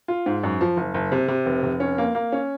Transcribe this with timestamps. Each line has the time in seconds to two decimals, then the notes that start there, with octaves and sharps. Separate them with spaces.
0.08 F4
0.26 G#2
0.44 F#2
0.61 F3
0.77 F#1
0.94 F#1
1.12 C3
1.28 C3
1.46 F1
1.63 F1
1.80 C#4
1.98 A#3
2.15 A#3
2.32 C#4